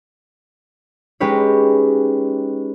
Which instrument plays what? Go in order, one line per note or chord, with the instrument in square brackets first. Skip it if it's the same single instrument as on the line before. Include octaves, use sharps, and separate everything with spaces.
[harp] G#3 C#4 D#4 G4 B4 C#5